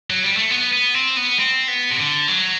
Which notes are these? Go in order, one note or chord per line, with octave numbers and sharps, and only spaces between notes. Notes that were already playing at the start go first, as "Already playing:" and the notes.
F#3
G3
A3
B3
B3
C4
B3
C4
B3
C3
D3
F#3